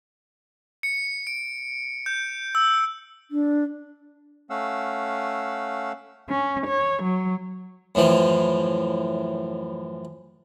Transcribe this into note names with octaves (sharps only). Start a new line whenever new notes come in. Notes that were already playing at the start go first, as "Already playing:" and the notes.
C#7
D7
G6
E6
D4
A3 C#4 F5 F#5 E6
C#4
C#5
F#3
F#2 A2 E3 F3